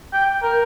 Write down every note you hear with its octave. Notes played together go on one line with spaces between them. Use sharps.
G5
A#4